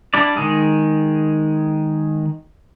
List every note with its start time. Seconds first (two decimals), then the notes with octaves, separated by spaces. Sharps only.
0.14 G3 D4 E4 D5
0.37 D#3 G#3 G#4